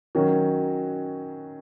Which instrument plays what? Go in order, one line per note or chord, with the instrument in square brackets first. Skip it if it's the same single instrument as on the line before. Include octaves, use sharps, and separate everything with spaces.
[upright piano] D#3 F#3 C#4 F#4